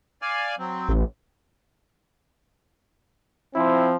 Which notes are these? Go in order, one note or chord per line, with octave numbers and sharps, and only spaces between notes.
D5 F5 G#5
F#3 C4
A1
F3 C4 E4